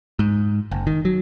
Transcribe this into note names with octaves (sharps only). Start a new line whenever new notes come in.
G#2
F#1
D#3
F#3